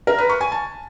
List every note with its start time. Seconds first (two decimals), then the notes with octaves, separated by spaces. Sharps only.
0.07 A#4
0.18 B4
0.29 C#6
0.41 G#5
0.52 A5